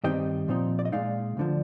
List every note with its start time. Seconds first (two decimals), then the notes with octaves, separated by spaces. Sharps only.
0.04 G2 D#3 G3 C4 D#4 D#5 G5
0.48 A#2 F3 C4 D#4
0.79 D5
0.85 D#5
0.92 A#2 G#3 D#4 D5 F5
1.37 D2 D3 F3